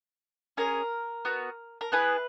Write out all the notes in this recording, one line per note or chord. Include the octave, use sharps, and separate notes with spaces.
C#4 G#4 A#4
B3 F#4
A#4
B3 E4 G#4 B4